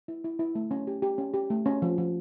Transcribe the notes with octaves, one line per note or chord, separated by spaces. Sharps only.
E4
E4
E4
A3
C#4
G4
G4
C#4
G4
A3
C#4
F3
F3